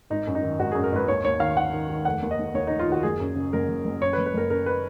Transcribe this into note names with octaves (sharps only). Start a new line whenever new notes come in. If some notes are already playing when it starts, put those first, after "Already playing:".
G#1 D#4
F#2
D#4
D#3
G#1 F#4
F#2 G#4
A#4
G#1 B4
D#2 C#5
D#2 C#5
D#3 F5
D#3 F#5
D#3
D#3
F1 F#5
D#2
D#5
D#2
D#2 C#5
F1 D#4
F4
D#3 F#4
F#1 G#4
F#2
C#3
F#1 A#4
F#1
F#1
F#2 C#5
B4
F#1
B4
F#1 A#4
F#2 A#4
B4